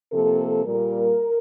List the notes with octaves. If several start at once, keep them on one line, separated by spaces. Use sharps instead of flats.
C3 F3 A#3 A4
A#2 G3 A#3 A#4